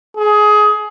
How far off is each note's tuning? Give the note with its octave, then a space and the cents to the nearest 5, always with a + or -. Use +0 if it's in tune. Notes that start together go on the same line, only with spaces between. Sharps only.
G#4 +20